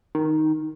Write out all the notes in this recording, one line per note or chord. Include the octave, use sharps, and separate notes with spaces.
D#3